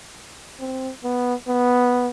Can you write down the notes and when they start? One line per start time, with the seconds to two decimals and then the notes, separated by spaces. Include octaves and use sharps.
0.60 C4
1.04 B3
1.48 B3